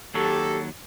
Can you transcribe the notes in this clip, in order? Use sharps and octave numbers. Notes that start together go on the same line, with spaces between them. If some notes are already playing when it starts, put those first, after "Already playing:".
D#2 F#3 G4 A4